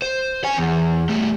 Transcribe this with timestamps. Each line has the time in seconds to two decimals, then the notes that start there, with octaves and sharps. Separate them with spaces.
0.02 C5
0.44 C#5 G#5
0.57 E2
1.09 G3 A3